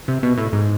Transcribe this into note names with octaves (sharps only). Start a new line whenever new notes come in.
C3
B2
A2
G#2